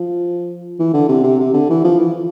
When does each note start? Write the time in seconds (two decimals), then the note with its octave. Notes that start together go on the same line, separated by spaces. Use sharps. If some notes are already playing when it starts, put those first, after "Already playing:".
Already playing: F3
0.79 E3
0.94 D3
1.08 C3
1.23 C3
1.39 C3
1.54 D3
1.70 E3
1.84 F3
1.99 E3